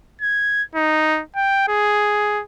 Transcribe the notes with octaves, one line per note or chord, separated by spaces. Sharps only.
G#6
D#4
G5
G#4